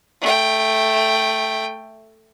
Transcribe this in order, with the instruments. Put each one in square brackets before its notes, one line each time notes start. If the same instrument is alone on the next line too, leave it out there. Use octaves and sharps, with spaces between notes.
[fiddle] A3 G5